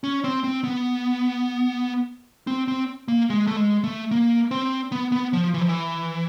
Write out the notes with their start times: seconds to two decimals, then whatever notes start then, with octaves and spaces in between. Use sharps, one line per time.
0.04 C#4
0.24 C4
0.44 C4
0.64 B3
2.47 C4
2.68 C4
3.08 A#3
3.30 G#3
3.47 A3
3.57 G#3
3.84 A3
4.11 A#3
4.51 C4
4.92 B3
5.12 B3
5.33 F3
5.54 E3
5.61 F3
5.69 E3